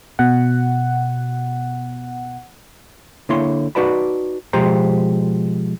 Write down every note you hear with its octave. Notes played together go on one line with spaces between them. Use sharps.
B2 F#5
D3 A#3 E4 C#5 C6
D#4 F#4 B4 D5 A5 B5
B2 F3 G#3 G4 C5 A#5